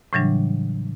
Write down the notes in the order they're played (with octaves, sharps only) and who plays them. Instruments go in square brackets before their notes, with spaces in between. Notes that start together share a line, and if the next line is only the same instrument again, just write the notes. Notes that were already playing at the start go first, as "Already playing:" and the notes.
[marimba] A2 C#3 E3 F#3 G3 D4